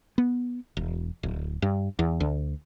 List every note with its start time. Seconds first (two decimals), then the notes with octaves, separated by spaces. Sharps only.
0.18 B3
0.77 E1
1.23 D1
1.62 G2
1.99 E2
2.20 D2